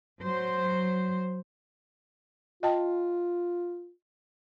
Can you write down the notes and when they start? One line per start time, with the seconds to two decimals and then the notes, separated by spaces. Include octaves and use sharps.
0.20 F#3 C5
2.63 F4 D#5 G5 A5